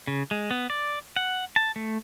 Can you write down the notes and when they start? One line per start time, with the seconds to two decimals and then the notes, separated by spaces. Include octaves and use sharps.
0.07 C#3
0.31 G#3
0.51 B3
0.70 D5
1.16 F#5
1.56 A5
1.76 A3